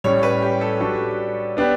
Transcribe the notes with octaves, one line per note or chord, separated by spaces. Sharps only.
A2 G3 C#4 C#5
B4
G4
A4
G3 D4 F#4 A4
B3 D4 G4 B4